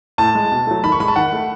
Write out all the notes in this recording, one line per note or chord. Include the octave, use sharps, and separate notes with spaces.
A2 A5
G#3
B2
F#3 A3
D#3 B5
C#6
G#3 B5
A5
D#3 F#5
A3